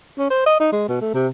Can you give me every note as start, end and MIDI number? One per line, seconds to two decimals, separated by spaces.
0.19 0.28 61
0.30 0.45 72
0.46 0.59 75
0.60 0.71 63
0.72 0.88 56
0.88 0.99 47
1.01 1.10 57
1.14 1.28 48